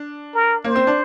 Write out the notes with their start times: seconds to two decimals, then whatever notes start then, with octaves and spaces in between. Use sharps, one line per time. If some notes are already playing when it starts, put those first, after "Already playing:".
Already playing: D4
0.34 A#4
0.64 A#3 C5
0.76 C4
0.87 D4